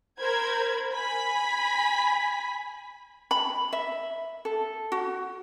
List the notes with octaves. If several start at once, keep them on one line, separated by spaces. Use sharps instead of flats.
A#4 C5 B5 G#6
G#5 B5 B6
B5
E5
A4
F#4